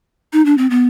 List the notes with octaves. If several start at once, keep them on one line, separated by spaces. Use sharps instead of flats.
D#4
D4
C4
B3